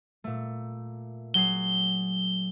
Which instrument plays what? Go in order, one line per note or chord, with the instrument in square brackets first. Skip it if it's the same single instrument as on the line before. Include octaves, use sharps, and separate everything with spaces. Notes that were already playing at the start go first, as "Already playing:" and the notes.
[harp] A#2 A3
[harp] F#3 G#4 C7 [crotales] G7